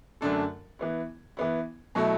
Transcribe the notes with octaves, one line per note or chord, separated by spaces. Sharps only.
F#2 D3 A3 D4 A4
E3 B3 E4
E3 B3 E4
B2 F#3 A3 E4